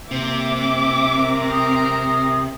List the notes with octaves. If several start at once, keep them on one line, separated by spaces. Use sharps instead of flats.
C3 A#3 C5 E5 D6
C4 A#4
D#6